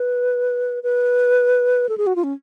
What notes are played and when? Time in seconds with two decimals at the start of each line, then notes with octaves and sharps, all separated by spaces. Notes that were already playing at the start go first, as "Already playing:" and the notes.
Already playing: B4
0.83 B4
1.89 A4
1.98 G#4
2.07 F#4
2.16 F4
2.24 C#4